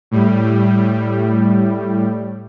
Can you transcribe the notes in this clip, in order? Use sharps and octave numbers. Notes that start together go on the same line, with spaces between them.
A2 G3